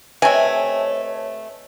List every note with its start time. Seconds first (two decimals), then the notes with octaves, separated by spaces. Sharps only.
0.22 C3 A3 B4 C#5 D#5 G#5 A5